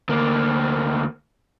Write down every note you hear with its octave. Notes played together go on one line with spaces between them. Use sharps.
D2 A#3